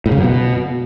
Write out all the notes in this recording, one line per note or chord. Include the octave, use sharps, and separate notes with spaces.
A2
C#3
F#2
B2